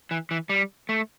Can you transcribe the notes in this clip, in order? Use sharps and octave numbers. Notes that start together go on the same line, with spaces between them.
E3
E3
G3
A3